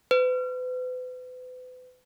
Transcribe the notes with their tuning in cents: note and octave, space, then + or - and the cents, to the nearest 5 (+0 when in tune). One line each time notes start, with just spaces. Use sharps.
B4 +40